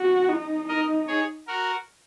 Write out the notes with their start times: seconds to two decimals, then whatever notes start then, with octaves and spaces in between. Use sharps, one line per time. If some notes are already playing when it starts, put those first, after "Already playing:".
Already playing: F#4
0.29 D#4
0.68 D#4 A#4 D#5
1.08 G#4 C#5
1.47 F#4 A#4